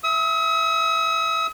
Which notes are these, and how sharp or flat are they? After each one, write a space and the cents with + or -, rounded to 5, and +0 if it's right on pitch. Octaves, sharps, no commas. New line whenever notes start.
E5 +15 D#6 +45